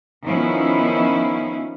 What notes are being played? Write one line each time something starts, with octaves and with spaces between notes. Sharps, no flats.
D#3 F3 B3 C#4 E4